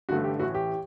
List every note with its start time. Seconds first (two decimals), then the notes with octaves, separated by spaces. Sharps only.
0.09 A1 G2 D3 A3 F#4
0.24 G4
0.39 A1 A2 E3 F#4
0.54 G4